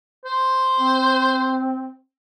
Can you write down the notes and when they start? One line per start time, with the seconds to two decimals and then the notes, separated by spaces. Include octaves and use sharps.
0.25 C5
0.80 C4